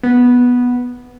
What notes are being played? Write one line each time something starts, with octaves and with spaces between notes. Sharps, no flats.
B3